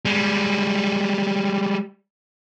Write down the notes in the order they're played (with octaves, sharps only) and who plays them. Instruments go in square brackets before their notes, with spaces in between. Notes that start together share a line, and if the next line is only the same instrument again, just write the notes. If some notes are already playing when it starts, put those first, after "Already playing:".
[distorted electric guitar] G3 G#3